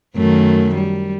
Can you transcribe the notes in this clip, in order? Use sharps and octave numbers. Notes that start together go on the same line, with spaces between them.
F#2 D#3 A3
G3